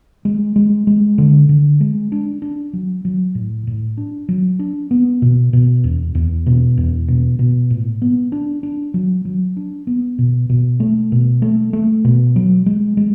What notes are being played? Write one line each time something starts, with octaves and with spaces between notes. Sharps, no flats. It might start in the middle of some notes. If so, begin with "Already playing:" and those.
G#3
G#3
G#3
D3
D3
G#3
D4
D4
F#3
F#3
A2
A2
D4
F#3
D4
B3
B2
B2
E2
E2
B2
E2
B2
B2
A2
B3
D4
D4
F#3
F#3
D4
B3
B2
B2
A3
B2
A3
A3
B2
F#3
G#3
G#3